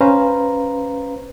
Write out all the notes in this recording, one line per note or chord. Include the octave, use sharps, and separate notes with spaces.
C#4 B4 C5 F5 A#5